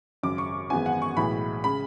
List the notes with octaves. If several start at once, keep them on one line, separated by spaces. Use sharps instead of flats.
G#1 F#2 C#3 D6
C#6
G#1 F#2 E3 G#3 B3 G#5
F#5
C#6
B1 A2 E3 G#3 B5
C#3 G#3 B5